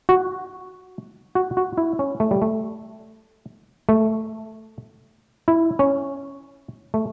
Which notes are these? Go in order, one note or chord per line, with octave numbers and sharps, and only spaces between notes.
F#4
F#4
F#4
E4
C#4
A3
G3
A3
A3
E4
C#4
A3